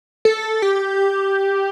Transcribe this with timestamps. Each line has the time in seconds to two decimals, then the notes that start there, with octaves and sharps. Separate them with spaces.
0.25 A4
0.62 G4